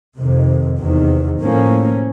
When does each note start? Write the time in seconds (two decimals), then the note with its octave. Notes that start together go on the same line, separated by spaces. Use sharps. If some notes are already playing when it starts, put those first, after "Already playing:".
0.17 F2 C3 D#3
0.80 E2 C3 D#3
1.42 A2 F3 A#3 C#4